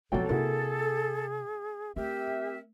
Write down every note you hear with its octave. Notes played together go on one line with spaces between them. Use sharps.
B1 F3 C4 F#4 A4 G5
C3 A#3 E4 F#4 G#4
A3 C4 G4 A#4 E5